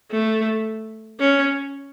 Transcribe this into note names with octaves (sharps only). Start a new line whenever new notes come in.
A3
C#4